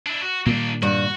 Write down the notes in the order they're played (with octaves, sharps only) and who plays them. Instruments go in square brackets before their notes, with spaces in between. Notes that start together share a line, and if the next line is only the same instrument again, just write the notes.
[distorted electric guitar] D4 E4
F#4
[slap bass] A#2 D#3 G3 [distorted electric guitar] A#3 D4
[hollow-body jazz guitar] G2 [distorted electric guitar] F#4